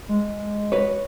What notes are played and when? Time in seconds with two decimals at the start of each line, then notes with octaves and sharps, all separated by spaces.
0.09 G#3
0.72 F#4 B4 C#5